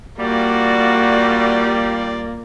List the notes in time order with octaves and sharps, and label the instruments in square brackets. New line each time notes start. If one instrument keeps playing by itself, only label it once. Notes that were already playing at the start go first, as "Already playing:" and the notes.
[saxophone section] G3 [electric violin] A#3 [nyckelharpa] F4 D5 [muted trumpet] F#4